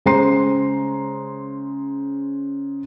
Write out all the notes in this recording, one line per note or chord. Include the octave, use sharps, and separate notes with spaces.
C#3 G#3 C5 A#5 C6 C7